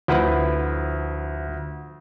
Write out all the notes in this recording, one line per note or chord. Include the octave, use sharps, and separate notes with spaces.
D2 F3 E4 B4 F#5